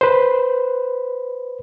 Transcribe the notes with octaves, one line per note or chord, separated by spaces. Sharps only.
B4 C5